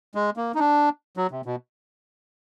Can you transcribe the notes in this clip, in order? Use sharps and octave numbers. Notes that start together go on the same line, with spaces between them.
G#3
A#3
D#4
D4
F#3
C3
B2